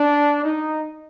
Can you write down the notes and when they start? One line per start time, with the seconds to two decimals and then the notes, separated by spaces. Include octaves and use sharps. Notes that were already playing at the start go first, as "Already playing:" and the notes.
Already playing: D4
0.43 D#4